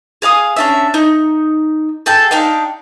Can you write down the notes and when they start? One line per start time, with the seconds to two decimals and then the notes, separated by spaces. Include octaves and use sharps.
0.22 G#4 F5 C#6 D#6
0.56 C#4 D4 E5
0.94 D#4
2.06 G#4 A4 G5 A5
2.31 D4 D#4 F5 G5